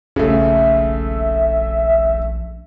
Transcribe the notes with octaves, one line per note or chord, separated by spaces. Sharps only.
D#1 A#1 C#3 A3 E5